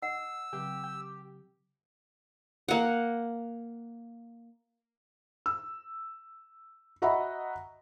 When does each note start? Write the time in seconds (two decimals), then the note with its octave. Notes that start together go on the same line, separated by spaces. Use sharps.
0.03 D#5 F#5 E6
0.53 C#3 F#3 C4 G4
0.84 G4
2.68 A#3 F#5
5.46 E6
7.02 F#4 D#5 E5 F#5 A#5 B5